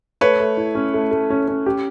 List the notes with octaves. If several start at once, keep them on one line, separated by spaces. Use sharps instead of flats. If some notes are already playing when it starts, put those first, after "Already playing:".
A3 B4 C#5
A3
E4
C#4
A3
A3
C#4
C#4
G4